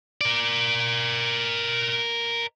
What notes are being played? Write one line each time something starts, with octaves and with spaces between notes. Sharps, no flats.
A#4 D5